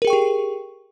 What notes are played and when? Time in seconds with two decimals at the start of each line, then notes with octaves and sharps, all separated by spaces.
0.02 A#4
0.05 G#4
0.07 G5
0.10 C#6
0.13 G4